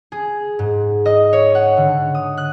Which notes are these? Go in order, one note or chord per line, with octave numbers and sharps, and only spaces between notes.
G#4
G#2
D#5
C#5
F#5
D3
D#6
F#6